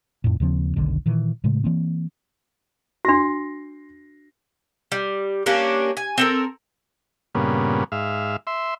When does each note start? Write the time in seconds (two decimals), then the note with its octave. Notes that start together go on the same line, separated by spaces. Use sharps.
0.24 F2 A2
0.40 D#2 C#3 F3 C4
0.76 F1 B1 D3 D#3
1.06 A#2 D#3 E3
1.44 A2 C#3 G#3 A3
1.64 E3 A#3 C4
3.05 D4 F#4 C6 A#6
4.92 G3
5.46 G3 A#3 C#4 D4
5.97 G#5
6.18 C4 A4 A#4
7.35 G2 A#2 C#3 B3
7.92 G#2 E5 F5
8.47 E5 C6